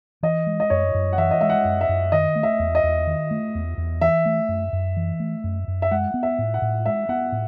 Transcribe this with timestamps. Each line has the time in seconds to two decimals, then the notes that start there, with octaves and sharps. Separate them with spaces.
0.23 E3 D#5
0.47 G#3
0.60 D#5
0.70 F#2 C#5
0.95 F#2
1.13 F#5
1.18 E3 E5
1.31 D#5
1.41 G#3 E5
1.50 F#5
1.65 F#2
1.81 E5
1.89 F#2
2.12 D#3 D#5
2.36 A3
2.43 E5
2.59 E2
2.75 D#5
2.84 E2
3.07 D#3
3.31 A3
3.55 E2
3.78 E2
4.01 E3 E5
4.26 A3
4.49 F#2
4.73 F#2
4.97 E3
5.20 A3
5.44 F#2
5.68 F#2
5.82 E5
5.91 G#3 F#5
6.14 B3
6.23 E5
6.39 A2
6.54 F#5
6.62 A2
6.86 G#3 E5
7.09 B3 F#5
7.32 A2